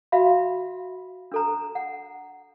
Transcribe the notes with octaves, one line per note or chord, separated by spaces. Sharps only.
F#4 E5 F5 B5
D4 A4 A#5
F#5